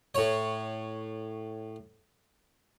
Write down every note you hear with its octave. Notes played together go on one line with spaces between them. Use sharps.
A2 C#5